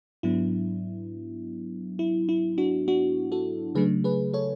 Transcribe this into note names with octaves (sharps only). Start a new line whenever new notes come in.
G#2 F#3 B3 D4 E4
E4
E4
D4 F#4
D4 F#4
F#4 A4
C#3 F#3 A3 D4 G#4 B4
G#4 B4
A4 C#5